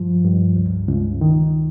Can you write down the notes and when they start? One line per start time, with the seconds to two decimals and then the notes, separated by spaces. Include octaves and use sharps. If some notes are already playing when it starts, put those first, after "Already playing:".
Already playing: G2 F3
0.24 G2
0.56 C#2
0.88 C#2
1.21 D#3